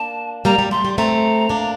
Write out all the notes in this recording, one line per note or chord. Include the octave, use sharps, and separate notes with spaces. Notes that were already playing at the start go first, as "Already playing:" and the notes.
Already playing: A#3 D4 A5
G3 A#3 A#5
G3
A3 C6
G3
A3 C4 A#5
A#3 D4